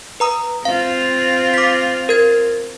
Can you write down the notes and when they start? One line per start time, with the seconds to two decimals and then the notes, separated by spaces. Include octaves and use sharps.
0.20 B4 A#5 D#6
0.65 C4 F4 F5
1.54 D6 B6
2.09 A#4 G#6